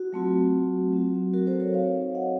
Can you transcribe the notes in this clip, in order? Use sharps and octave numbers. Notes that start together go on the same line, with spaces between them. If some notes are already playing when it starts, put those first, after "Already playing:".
Already playing: F#4
F#3 A3 C4 F4
F#3 C4 F#4
F#4 A#4
A4 C5
A#4 C#5
C4 D#4 F#4 C#5 F5
D#5 F#5